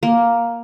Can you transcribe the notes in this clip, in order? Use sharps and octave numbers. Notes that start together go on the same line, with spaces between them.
A#3